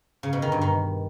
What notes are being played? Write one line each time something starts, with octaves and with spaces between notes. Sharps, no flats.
C#3
B2
D#3
G2
D#3